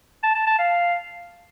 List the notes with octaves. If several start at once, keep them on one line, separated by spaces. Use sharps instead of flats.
A5
A5
A5
F5